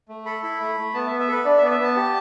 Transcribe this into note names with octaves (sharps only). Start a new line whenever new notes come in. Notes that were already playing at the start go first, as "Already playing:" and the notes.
A3
A4 B5
E4 B5
A3
A3
B3 A5
B3 E5
E5
A4 B4
D4 D5
E5
B3 D5
E5
B3 A5
G4